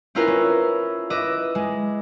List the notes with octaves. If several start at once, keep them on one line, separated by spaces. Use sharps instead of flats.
C4 C#4 E4 F4 A#4 B4
C#4
B4 D#5 E5 D6
G#3